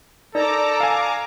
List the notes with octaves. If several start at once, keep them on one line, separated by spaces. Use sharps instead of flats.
D#4 A4 A#4 D5 A#5 D6
F5 G#5